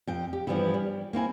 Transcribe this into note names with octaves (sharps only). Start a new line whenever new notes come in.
F2 G5
G4
G2 E3 F3 G3 B3 E4
G3
A#3 C4 E4 G#5